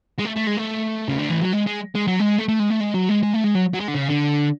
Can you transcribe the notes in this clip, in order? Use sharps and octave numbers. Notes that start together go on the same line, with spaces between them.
G#3
A3
A3
G#3
A3
C#3
D3
E3
F#3
G#3
G#3
G#3
F#3
G#3
A3
A3
G#3
A3
G#3
F#3
G#3
G#3
A3
G#3
F#3
F#3
G#3
D3
C#3
D3